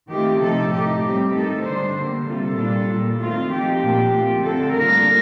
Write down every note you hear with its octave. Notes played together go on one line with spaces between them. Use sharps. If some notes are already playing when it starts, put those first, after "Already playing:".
D#3 A3 C4 F4 G4
C3 F3 A3 D#4 A4
A2 A3 D#4 G4
A2 G3 C4 G4
D#3 A3 D#4 A4
D3 G3 D4 C5
D3 G3 A#3
C3 G3 A#3 F4 A4
A#2 G3 D4 F4
A#2 G3 A#3
D#3 A3 C4 F4
F3 C4 D#4 G4
A#2 F3 A#3 D4 F4
F3 A3 C4 F4
D3 A3 C4 A4
A2 G3 A#3 D4 F4 A#4